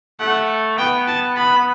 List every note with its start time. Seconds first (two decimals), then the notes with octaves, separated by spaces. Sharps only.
0.20 A3 F#5
0.78 B3 G5
1.07 A5
1.37 B5